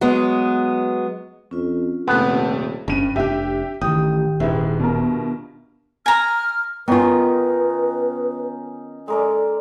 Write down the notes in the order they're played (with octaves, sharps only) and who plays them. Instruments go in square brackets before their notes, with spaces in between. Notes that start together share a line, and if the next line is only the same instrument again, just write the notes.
[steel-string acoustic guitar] F#3 G#3 B3
[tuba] F2 [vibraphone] C#4 F4
[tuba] D#1 [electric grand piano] F2 C3 A3 [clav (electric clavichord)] B3
[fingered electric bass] F#1 C#4 [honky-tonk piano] G2 D#7
[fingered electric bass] F1 D4 [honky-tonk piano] G4 E5
[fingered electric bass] A1 [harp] D#3 G4 G5 [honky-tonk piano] D#6
[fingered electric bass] D#1 [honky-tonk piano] G#2 D#3 [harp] E4 B4 E5
[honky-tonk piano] B2 A#4 [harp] D4 F4
[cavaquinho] G#5 A#5 [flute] F6
[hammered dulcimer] D#3 C#4 D#4 [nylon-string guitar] B3 F4 [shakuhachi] B4
[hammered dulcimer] G#3 A#4 D5 [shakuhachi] A4